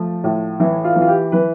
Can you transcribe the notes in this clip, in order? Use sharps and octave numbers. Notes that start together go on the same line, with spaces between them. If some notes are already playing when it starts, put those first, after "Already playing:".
Already playing: F3 A3
A2
E3 E4
F4
E3
F4
G4
E3 B4